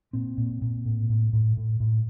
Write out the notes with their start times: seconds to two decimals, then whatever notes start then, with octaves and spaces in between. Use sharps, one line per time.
0.13 A#2 C4
0.38 A#2
0.62 A#2
0.85 A2
1.10 A2
1.33 A2
1.57 A2
1.80 A2